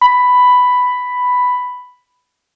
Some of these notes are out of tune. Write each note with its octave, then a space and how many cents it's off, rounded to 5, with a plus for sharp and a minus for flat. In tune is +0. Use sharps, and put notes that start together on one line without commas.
B5 +5